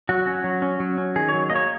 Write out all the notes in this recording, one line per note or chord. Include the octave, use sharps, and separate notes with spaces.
F#3 F#4
C#4
F#3
C#4
F#3
C#4
D#3 G#4
C#5
F#3
A#3 D#5
C#5